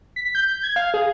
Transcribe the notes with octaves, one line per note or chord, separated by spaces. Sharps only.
B6
G6
G#6
F5
G#4